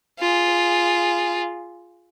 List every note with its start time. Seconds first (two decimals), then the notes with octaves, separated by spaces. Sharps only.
0.20 F4 G#4